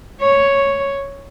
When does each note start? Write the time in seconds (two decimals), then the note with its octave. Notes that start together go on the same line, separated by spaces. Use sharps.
0.21 C#5